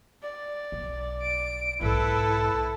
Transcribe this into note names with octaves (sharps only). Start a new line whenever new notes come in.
D5
B1
D7
B1 G#2 E4 A4 B4